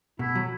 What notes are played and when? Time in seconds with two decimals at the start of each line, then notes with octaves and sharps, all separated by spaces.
0.19 B2 E4
0.35 F#3